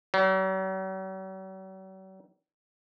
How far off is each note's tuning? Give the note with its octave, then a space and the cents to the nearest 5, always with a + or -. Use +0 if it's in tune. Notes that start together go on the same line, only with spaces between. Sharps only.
F#3 +45